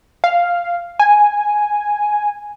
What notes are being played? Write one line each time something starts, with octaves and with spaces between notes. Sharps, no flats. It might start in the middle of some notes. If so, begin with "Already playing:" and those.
F5
G#5